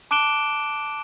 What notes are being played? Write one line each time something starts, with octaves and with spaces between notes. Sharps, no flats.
A5 D6 F#6 D7 E7 G7